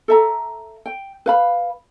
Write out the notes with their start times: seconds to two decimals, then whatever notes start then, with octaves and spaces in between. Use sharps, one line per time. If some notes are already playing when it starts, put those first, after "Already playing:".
0.08 A4 E5 A#5
0.86 G5
1.26 B4 F5 B5